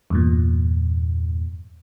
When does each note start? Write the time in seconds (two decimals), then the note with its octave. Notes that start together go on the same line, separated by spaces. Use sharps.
0.10 E2 G2 A#2